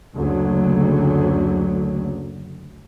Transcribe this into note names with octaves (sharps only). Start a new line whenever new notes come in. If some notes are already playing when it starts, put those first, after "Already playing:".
F#1 D2 F#3